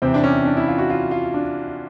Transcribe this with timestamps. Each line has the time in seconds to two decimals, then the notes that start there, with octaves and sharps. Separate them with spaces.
0.02 E2 C3 E3 C4
0.14 D4
0.24 C#4
0.45 D4
0.57 E4
0.68 F4
0.78 F#4
0.90 F4
1.11 F4
1.34 D4